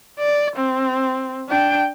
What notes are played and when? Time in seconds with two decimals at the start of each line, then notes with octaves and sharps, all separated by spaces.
0.19 D5
0.56 C4
1.49 D4 G5